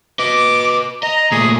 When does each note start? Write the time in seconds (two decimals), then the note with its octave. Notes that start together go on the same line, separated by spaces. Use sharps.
0.19 B4 D#5 D6
1.03 D#5 A#5
1.32 A#2 A3 G#4